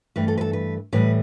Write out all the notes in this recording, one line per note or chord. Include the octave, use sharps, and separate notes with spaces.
G2 E3 A3 B4
A4
B4
A4
B4
A2 E3 G3 B4